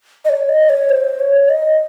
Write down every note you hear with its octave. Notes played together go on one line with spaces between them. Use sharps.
D#5
C#5
D#5
C#5
C5
C#5
D#5